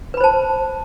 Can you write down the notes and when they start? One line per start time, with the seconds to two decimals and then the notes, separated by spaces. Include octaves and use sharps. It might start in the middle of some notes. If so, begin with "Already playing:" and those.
0.14 B4
0.17 B5
0.20 C5
0.24 A5